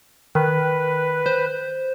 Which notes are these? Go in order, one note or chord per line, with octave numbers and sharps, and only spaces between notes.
D#3 B4
C5